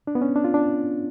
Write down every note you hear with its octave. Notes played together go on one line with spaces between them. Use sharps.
D4
B3
C#4
D4
F4
D4